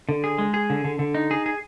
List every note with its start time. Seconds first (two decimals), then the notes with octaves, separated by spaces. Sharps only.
0.09 D3
0.24 G#4
0.38 G#3
0.54 G#4
0.70 D3
0.84 D3
0.99 D3
1.15 D#4
1.31 G#4
1.46 G#4